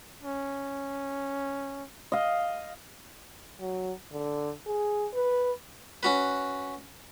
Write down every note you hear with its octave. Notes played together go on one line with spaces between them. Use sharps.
C#4
D#5 F5
F#3
D3
G#4
B4
C#4 F#4 B4